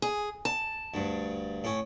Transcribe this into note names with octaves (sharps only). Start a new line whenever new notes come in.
G#4
A5
D2 G2
A2 C#4